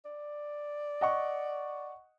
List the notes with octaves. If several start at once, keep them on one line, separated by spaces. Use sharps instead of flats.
D5
D#5 F#5 C#6